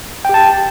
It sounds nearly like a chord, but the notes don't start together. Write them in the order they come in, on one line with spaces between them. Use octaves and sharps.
G5 G4 A5